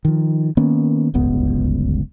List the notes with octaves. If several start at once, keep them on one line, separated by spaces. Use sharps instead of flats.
D#3 F3
D#3 A#3 B3 C#4
D1 G1 C#2 B3